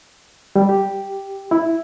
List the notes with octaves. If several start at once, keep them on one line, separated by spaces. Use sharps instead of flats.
G3
G4
E4